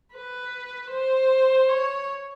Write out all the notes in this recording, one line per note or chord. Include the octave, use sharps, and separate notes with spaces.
B4
C5
C#5